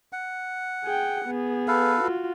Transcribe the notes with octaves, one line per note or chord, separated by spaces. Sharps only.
F#5
G#4 G5
B3 G#4
A4 B4 F5
F4 F#4